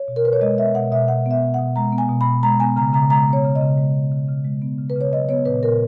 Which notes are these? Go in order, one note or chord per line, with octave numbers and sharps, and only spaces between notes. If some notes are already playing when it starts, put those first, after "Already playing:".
Already playing: C#5
B2
A#4
B2 B4
C#5
G#3 D#5
B3 E5
B2 F#5
B2 E5
G#3 F#5
B3 E5
B2
F#5
B2
G#3 A#5
B3
G#5
B2
B5
B2
G#3 A#5
B3 G#5
C#3 A#5
C#3 A#5
G#3 A#5
B3
C#5
C#3
D#5
C#3
G#3
B3
C#3
C#3
G#3
B3
C#3
B4
C#3 C#5
F#3 D#5
B3 C#5
A#2 B4
A#2 A#4